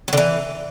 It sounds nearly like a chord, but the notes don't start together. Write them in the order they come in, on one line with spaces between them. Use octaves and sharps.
F#3 D3 E3